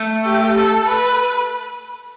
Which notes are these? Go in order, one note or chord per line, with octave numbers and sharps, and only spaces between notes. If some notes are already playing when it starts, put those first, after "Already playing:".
Already playing: A3
G4
A4
B4